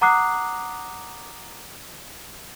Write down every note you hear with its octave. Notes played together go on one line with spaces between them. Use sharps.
F#5 A#5 D6 D#6 F#6 C7